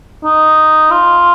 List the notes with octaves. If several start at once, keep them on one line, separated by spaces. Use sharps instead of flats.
D#4
F4